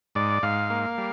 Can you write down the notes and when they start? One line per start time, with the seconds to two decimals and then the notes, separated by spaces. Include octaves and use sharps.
0.15 G#2 D5
0.43 G#2 F5
0.70 A#3
0.98 G3